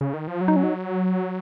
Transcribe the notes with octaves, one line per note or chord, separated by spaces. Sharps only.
C#3
D#3
F3
F#3
D#4
C#4
D#4